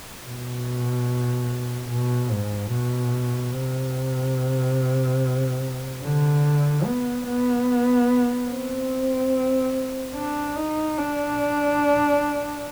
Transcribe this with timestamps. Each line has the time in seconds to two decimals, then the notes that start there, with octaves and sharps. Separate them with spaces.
0.24 B2
1.90 B2
2.31 G#2
2.72 B2
3.54 C3
6.02 D3
6.85 B3
7.26 B3
8.49 C4
10.15 D4
10.56 D#4
10.98 D4